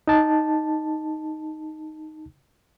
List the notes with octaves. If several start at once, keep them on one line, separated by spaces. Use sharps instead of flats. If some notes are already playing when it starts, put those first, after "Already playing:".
D#4 A5